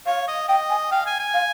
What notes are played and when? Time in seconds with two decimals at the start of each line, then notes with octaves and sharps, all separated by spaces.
0.06 C#5 F5
0.27 D#5
0.48 D#5 G5
0.70 G#5
0.91 F5 G5
1.06 G#5
1.19 G#5
1.34 F5